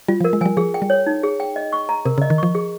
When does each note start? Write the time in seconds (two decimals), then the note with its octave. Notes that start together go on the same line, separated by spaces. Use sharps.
0.08 G3 F4
0.21 F3
0.24 A#4
0.33 G#3
0.41 F3 G3 G#5
0.57 F3 G#4
0.74 G5
0.82 G3
0.90 C#5
1.06 D#4
1.23 G#4
1.40 G5
1.56 D#5
1.72 C#6
1.89 A#5
2.05 C3 A#4
2.18 C#3
2.22 D#5
2.30 D#3
2.38 F3 C#6
2.55 G#4